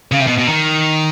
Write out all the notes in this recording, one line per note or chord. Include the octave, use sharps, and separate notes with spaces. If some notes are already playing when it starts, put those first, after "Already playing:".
C#3
C3
B2
B2
D#3